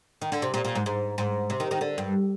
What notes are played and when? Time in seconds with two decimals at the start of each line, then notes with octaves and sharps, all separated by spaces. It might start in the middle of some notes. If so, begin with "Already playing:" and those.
0.22 D#3
0.32 D3
0.42 C3
0.54 A#2
0.65 A#2
0.75 G#2
0.86 G#2
1.18 G#2
1.50 C3
1.60 D#3
1.71 D#3
1.81 D3
1.98 G2